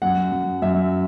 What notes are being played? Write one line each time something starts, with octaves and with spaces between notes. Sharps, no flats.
F#2 F#5
F#2
F#2 E5